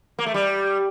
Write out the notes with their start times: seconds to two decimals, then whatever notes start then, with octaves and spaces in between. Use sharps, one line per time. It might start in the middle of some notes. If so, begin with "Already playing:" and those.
0.19 A#3
0.26 A3
0.34 G3